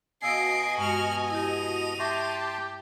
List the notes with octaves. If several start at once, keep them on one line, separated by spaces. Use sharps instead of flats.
B2 D#5 F5 G#5 E6 C7 D7
G2 G#3 F#4 F6
E4 G4 D#7 F7
G4 E5 A5 C6 C#6 A#6